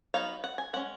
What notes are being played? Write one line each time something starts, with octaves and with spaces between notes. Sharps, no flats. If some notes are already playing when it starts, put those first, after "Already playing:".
F#3 B3 D#4 F5
F#5
G#5
G#3 C#4 F#5